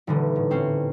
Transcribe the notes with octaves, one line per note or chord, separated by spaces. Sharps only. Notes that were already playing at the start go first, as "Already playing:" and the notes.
D#1 D3 E3
A2
C4 C#4 C7